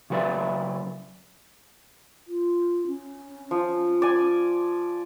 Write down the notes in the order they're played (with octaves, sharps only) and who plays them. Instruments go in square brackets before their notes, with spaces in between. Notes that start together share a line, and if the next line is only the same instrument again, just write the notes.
[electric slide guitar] C#3 F#3 F#4 B4 D5 E5
[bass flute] F4
C#4
[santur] F3
D5 G#5